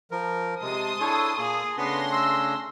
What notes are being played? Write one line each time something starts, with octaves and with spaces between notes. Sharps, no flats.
F3 A#4
C3 G#3 A5 C6 D#6
D4 E4 G#4 A4 C#5
A#2 A#3 G#4
C#3 A3 B3 C#4 D4 C6 A#6
E6